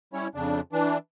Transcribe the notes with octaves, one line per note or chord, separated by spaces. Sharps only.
G3 C#4 E4 C#5
F2 C#3 D4
E3 D4